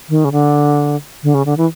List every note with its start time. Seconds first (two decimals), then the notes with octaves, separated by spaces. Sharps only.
0.09 D#3
0.25 C#3
0.32 D3
1.23 D3
1.34 C#3
1.46 D3
1.58 E3